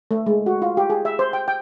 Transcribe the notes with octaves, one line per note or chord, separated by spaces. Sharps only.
A3
G#3
F#4
F4
G4
G#4
E5
C5
G5
G5